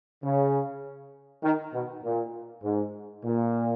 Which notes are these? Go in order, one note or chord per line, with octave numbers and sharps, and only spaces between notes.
C#3
D#3
B2
A#2
G#2
A#2